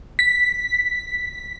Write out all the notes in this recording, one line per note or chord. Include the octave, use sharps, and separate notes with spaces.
B6